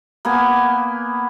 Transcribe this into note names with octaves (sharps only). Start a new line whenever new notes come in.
A#3 B3 G#5